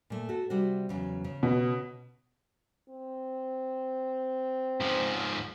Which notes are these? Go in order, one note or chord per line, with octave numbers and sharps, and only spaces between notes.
A#2 A3
F#4 A4
C3 G3 F#4
E2 C#3 F#3
C#3
B2
C4
G#2 F3